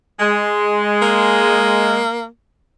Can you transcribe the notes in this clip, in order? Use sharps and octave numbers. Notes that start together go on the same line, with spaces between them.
G#3
A#3